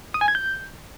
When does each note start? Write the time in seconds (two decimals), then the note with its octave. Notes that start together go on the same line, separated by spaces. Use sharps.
0.14 D#6
0.21 G#5
0.28 G#6
0.35 G6